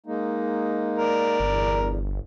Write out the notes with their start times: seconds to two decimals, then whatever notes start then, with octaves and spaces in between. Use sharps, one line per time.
0.06 G#3 A#3 D#4
0.98 A#4 D5
1.40 G1 E2